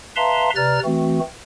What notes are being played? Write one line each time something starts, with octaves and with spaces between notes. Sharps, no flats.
B4 E5 F5 A5 A#5 C6
C3 B4 D5 A#5 F6 A6
E3 A3 C4 F#4